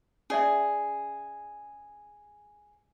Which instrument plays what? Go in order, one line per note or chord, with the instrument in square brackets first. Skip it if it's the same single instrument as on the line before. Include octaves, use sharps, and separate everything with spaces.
[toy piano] C#4 D5 E5 [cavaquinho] G#4